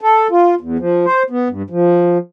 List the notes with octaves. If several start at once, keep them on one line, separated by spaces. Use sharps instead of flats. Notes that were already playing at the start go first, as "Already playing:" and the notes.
A4
F4
E2
F3
C5
B3
G2
F3